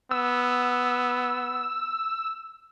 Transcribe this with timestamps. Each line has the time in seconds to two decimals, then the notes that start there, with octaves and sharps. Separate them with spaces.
0.11 B3 E6